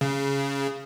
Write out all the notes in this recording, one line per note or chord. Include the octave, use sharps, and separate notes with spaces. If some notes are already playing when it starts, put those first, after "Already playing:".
C#3